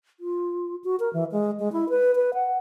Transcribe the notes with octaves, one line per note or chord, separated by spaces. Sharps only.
F4
F#4
A#4
E3
G#3
G#3
E4
B4
B4
F#5